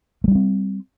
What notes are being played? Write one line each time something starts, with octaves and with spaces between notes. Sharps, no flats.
G3 A3 C4 D4